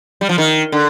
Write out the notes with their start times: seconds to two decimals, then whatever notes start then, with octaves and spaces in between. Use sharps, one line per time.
0.21 G3
0.29 F3
0.38 D#3
0.72 D3